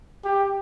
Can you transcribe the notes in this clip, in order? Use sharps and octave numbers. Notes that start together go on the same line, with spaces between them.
G4